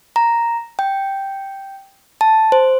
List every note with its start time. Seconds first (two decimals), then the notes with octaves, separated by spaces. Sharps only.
0.16 A#5
0.79 G5
2.21 A5
2.52 C5